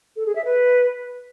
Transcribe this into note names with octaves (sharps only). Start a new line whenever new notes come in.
A4
G#4
E5
B4